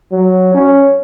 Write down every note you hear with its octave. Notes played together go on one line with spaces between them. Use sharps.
F#3
C#4